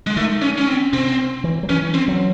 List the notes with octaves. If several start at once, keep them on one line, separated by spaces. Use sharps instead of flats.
G#3
D#3 A3
C#4
C#4
C4
C3 C4
E3
F#3
E3 C#4
C4
F#3